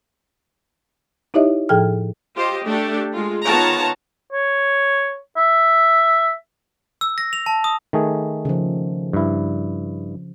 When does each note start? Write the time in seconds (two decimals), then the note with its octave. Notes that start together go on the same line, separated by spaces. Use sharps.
1.34 D#4 E4 G4 C#5 D#5 E5
1.69 A2 F3 G#4 A4 G5 F6
2.35 F4 G4 C5 D#5
2.64 A3 D4 G4 A4
3.14 G#3 F4
3.44 D#3 B3 F4 C#5 A5 A#5
4.32 C#5
5.37 E5
7.01 E6
7.18 A#6
7.33 F7
7.46 A5
7.64 D#6
7.93 D#3 A3 G#4
8.45 C#3 F3
9.13 G2 E4